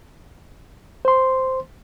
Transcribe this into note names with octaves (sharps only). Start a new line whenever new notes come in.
C5 C6